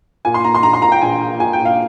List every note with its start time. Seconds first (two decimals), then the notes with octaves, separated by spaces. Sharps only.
0.25 A#2 G#5
0.34 C6
0.44 A#2 A#5
0.55 C6
0.63 A#1 A#5
0.73 C6
0.82 A#2 A#5
0.92 G5
1.01 A#1 G#5
1.21 A#2
1.40 A#2 G#5
1.53 G5
1.59 A#2
1.65 F5